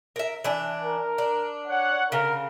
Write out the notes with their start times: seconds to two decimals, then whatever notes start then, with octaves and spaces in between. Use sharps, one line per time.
0.16 A#4 E5
0.44 E3 D4
0.84 A#4
1.18 D4
1.68 C#5 F#5
2.12 C#3 A#4